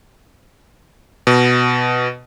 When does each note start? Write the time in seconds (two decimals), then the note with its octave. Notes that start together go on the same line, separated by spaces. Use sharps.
1.27 B2